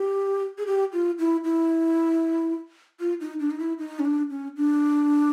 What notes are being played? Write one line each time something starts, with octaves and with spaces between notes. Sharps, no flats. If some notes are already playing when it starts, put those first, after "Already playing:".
Already playing: G4
G#4
G4
F4
E4
E4
F4
D#4
D4
D#4
E4
D#4
C#4
D4
C#4
D4